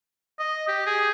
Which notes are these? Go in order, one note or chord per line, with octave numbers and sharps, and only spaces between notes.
D#5
G4
G#4